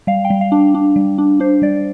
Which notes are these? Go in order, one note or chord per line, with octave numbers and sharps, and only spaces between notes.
G3 F5
G5
G3
F5
D4
D4
G3
D4
D4 C5
G3 D5